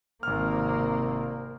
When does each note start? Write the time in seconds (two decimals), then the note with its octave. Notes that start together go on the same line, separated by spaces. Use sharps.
0.23 G#1 C3 A#3 F6